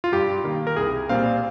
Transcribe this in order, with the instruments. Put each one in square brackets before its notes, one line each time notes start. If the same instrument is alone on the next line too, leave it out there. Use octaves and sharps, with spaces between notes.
[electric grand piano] F4
[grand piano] G2 [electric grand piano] G4
[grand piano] D#3 A#3
[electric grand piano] A#4
[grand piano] C2 [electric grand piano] G#4
[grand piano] A#2 G3 C4 F4 [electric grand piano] F5